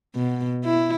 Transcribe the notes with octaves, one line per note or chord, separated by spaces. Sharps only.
B2
E4